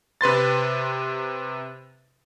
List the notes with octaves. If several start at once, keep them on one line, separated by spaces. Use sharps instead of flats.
C3 B4 C6 A6